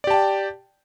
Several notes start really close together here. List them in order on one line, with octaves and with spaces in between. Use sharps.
D5 G4 A5 G5